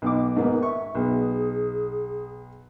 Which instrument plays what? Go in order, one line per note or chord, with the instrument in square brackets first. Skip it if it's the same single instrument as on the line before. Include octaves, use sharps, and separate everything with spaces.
[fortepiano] B1 D#4 D6
[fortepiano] G#2 A#3 B3 [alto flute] D#4
[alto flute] E5 [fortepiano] C#6
[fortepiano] B1 [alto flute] G#4